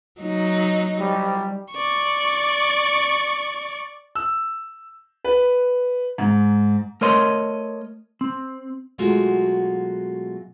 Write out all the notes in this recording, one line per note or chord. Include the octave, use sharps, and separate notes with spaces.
F#3 D#4
G3
D5 C#6
E6
B4
G#2
A3 A#4 C#5 D#5 C6
C4
B2 F#3 G#3 A3 F4 F#4